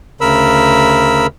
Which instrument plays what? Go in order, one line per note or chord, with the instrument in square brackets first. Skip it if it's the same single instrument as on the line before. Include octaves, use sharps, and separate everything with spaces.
[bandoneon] D2 C#3 A#4 B5 E6